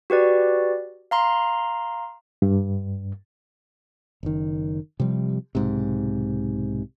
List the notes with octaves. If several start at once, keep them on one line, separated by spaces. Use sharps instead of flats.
F#4 G4 B4 D5
F5 A#5 C6
G2
F#1 D#3
C3 F3 G3
B1 G#2 C3